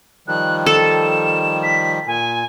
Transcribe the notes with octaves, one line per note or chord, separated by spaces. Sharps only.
D#3 F3 G3 F#6
A4 E7
B6
A#2 G#5